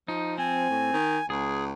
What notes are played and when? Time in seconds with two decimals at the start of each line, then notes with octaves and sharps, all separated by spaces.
0.08 F3 D#4
0.38 C4 G#5
0.70 A2
0.93 D#3
1.30 C#2 G#4